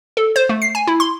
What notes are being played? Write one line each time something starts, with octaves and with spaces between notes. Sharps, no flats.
A4
C5
A3
C7
G#5
E4
C6